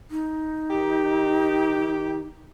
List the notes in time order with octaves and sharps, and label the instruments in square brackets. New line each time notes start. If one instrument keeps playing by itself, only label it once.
[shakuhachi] D#4
[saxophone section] D#3 G4